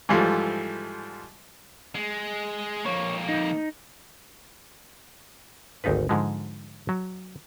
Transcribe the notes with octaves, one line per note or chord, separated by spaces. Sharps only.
G#2 E3 F3 G3 A3
G#3
F2 A#3 C#5
D#4
G#1 D2 D#4 F4 B4
G#2 D3 F3 G#3
F#3